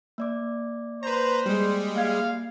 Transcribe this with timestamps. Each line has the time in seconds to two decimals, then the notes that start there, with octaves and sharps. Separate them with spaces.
0.18 A#3 D5 D6
1.03 B4 C5 A#5
1.46 G3 G#3
1.96 A#3 F5 G#6